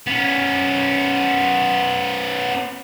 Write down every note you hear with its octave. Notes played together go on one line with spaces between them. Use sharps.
B3 C#4